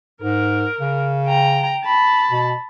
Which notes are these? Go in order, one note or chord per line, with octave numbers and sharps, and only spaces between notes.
G#2 A#4
C#3
G5 A#5
A5 B5
B2